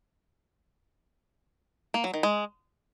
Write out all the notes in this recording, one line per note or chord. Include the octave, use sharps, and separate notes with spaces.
A#3
F#3
D#3
G#3